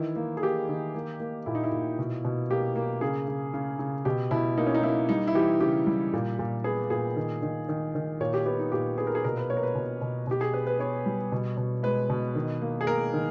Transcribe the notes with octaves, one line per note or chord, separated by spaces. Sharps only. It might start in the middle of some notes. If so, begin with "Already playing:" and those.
Already playing: D#3 E3 E4
A#3
G#4
A#3 G4
D#3
A#3
A#3
A#2 E4
D#4
E4
A#2
B2
B2
A#3 G4
A#3
C#3 G#4
C#3
C#3
C#3
B2 G4
B2 E4
A#3 D#4
C#4
D#4
A#3 E4
G3 D#4
E4
E3 G4
C#3 G4
G3
A#2
A#2
B3 G#4
A#2 G#4
D#3
D#3
D#3
D#3
A#2 C#5
G4
B3 G4
D#4
A#2 G4
B3 G#4
A#4
G#4
B2 A#4
B4
A#3 C#5
A#4
B4
B2
B2
B2 G4
G#4
B3 B4
B4
B3 C#5
G3
B2
B2
G#3 B4
B2
D#3
A#3
G#4
A#3 A#4
D#3